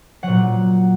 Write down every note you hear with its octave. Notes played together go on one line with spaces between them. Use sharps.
A#2 F#3 F#5